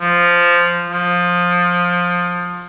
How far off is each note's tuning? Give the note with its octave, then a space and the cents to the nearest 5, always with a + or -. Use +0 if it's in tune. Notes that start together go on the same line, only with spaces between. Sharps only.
F3 -5
F3 +20